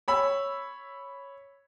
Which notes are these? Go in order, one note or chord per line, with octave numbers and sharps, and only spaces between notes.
C#5 B5 E6